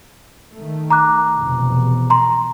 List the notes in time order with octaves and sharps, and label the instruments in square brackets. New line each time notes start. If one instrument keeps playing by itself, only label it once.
[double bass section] D#3 A3
[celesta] A#5 D6 F#6
[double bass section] F1 E2 B2
[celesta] A#5 C6